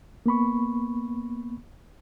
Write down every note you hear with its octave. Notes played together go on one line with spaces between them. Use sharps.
A#3 B3 B5 C#6